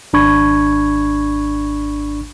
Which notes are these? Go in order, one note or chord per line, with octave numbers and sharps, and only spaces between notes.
G#1 D4 B5 C#6 G#6